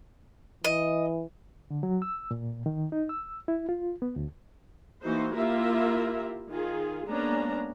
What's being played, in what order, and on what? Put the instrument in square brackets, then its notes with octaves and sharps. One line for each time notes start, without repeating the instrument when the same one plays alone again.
[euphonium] E3 [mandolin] D#5
[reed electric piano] D3
F#3
E6
A#2
D#3
D#4
E6
E4
F4
B3
D2
[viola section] E3 A#3 D#4 F#4 C5
A#3 E4 F4 G4 A#4 E5
D#3 F4 G#4
G#3 A#3 B3 C#4 D4 A#5